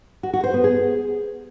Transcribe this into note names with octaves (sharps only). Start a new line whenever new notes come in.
F#4
F#4
C5
B3
G#4